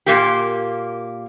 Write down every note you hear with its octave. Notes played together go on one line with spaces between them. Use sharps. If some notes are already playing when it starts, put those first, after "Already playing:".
A#2 A#3 G4